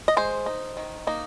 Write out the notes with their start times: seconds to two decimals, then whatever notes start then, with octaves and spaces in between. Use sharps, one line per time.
0.08 D#5
0.17 G#3 C5
0.46 D#4
0.77 D#3
1.07 A#3 D#4